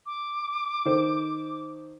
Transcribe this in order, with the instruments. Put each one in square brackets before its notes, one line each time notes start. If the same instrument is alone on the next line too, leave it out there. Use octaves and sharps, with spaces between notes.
[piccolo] D6
[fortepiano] D#3 A4 C5